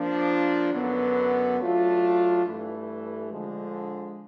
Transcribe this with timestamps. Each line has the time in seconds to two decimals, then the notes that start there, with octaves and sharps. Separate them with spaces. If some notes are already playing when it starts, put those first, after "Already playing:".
Already playing: F3 A#3 D4
0.73 F#2 D3 F#3 B3
1.58 F#3 A3 D4 F4
2.45 G2 E3 A3
3.31 D3 F3 G#3